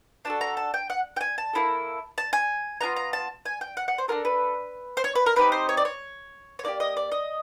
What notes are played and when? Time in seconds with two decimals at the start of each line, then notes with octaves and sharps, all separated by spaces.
0.25 D4 F#4 A4 A5
0.41 A#5
0.57 A5
0.74 G5
0.90 F#5
1.16 G5
1.21 G#5
1.38 A5
1.53 A#3 C#4 E4 A4
2.18 A5
2.33 G#5
2.81 B3 D4 F4 A#5
2.96 A#5
3.13 A5
3.45 G#5
3.61 G5
3.77 F#5
3.88 F#5
3.98 C5
4.08 D4 F4 A4 A#4
4.25 B4
4.97 C5
5.04 C#5
5.15 B4
5.26 A#4
5.36 C4 D#4 G4 B4
5.52 C5
5.69 C#5
5.77 D5
5.85 C#5
6.59 C#5
6.63 A#3 D#4 G4 D5
6.80 D#5
6.97 D5
7.12 D#5